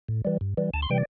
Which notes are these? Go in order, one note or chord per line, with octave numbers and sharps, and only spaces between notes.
A2
E3 G3
G2
E3 G3
D2 A5
C6
C3 E3 G3 G5
D5